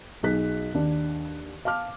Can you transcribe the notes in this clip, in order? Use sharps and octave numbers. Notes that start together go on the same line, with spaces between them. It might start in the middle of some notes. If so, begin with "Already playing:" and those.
B1 D#4 G#4 F#6 B6
D#2 D4 D5
F5 A5 D6 F6